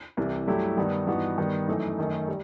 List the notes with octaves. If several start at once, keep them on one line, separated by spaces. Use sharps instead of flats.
C2 C3 E3
G2 F#3 A3 E4 G4
G2 D#3 G3 B3
G2 E3 B3 D#4 F#4
G2 D#3 G3 B3
F#2 E3 A3 D#4
F#2 D#3 A3 D#4
G3